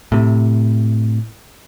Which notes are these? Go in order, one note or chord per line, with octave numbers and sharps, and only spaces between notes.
A2 C3